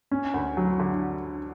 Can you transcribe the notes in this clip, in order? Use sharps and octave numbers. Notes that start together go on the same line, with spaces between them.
C#4
D2
F#3
D3